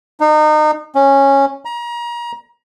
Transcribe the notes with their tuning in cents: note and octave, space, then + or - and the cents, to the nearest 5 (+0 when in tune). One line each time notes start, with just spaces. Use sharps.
D#4 -30
C#4 -10
A#5 +35